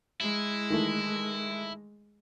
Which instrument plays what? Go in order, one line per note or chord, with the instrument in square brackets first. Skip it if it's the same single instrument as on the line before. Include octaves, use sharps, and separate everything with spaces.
[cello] G#3 [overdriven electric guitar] E4
[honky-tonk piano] D#3 E3 A3